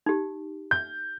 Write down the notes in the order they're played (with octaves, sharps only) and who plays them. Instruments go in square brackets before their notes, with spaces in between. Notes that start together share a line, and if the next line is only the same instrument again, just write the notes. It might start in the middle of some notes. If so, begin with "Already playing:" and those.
[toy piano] D#4 G4
[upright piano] G6